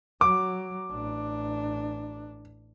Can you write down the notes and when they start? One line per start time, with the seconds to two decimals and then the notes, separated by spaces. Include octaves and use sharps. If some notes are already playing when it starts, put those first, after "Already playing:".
0.21 F#3 D6
0.91 A1 D4